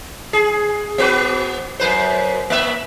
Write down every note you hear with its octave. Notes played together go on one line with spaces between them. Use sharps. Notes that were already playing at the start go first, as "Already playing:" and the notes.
G#4
B3 F#4 B4
F#2 B4 C5
A#3 E5